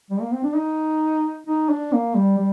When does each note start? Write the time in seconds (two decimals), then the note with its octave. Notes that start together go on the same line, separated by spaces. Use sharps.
0.10 G3
0.21 A#3
0.33 C4
0.44 D4
0.56 D#4
1.47 D#4
1.69 D4
1.93 A#3
2.15 G3
2.38 G3